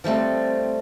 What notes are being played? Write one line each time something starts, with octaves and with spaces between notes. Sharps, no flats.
F3 G3 A3 C4